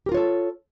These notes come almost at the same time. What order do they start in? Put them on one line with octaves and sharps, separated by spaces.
G4 A#4 F4 C#5 A4